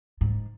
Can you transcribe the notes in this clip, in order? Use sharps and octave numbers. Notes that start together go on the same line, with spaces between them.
G#2